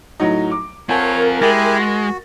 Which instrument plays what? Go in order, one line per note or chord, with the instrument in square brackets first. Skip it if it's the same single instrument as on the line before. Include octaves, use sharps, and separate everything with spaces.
[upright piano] A2 F#3 D#4
D6
[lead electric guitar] C4 F4 [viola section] A#4 [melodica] C#5 [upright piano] F#5 G#5 A5
[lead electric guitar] G#3 [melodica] E4 G4 G#5 [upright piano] A6 A#6
[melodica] F#4